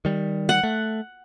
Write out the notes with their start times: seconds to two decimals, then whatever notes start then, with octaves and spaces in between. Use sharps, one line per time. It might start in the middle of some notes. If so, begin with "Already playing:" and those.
0.05 D#3 G3
0.49 F#5
0.63 A3